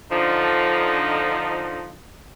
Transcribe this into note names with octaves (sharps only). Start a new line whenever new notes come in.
D3 F3 D#4